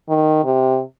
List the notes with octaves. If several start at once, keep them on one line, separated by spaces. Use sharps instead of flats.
D#3
C3